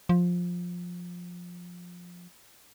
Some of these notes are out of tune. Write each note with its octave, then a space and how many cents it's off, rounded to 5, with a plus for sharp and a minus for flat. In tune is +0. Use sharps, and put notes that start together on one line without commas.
F3 +15